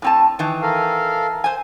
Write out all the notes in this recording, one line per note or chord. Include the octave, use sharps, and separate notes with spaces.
A2 C4 A5
D#3 E3
A4 A#4 F5
C5 G#5